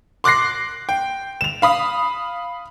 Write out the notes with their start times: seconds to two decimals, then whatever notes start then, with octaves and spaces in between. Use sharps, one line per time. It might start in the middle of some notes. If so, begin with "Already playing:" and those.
0.24 C6 D6 F#6 A#6 C7
0.89 G5
1.41 E7 F7
1.62 F5 B5 D#6